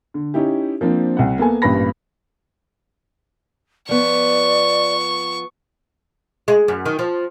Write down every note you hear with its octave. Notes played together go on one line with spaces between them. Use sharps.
D3
C#4 D#4 E4 G4
F3 A#3 C4 D4
C2 F#5
A#3 B3 A4 G#5
A1 G2 A#2 B4 B5 A#6
F3 B3 D5 C#6
G#3
F#2
D#3
F3